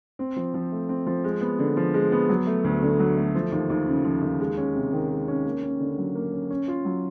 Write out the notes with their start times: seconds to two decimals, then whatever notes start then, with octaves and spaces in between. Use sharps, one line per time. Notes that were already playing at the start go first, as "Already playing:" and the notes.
0.19 C4
0.36 F3
0.54 F3
0.72 A3
0.89 C4
1.07 F3
1.24 G#3
1.41 B3
1.59 D3
1.77 F3
1.94 G#3
2.12 B3
2.29 F#3
2.47 A3
2.64 D2
2.83 D3
3.00 F#3
3.17 A3
3.35 F3
3.52 D#2
3.70 D#2
3.88 C#3
4.05 F3
4.22 D#2
4.40 G#3
4.57 C#4
4.75 C3
4.93 D#3
5.10 G#3
5.28 C#4
5.45 A#3
5.63 C#4
5.80 D3
5.98 F#3
6.15 A#3
6.33 C#4
6.50 C#4
6.68 F4
6.85 F#3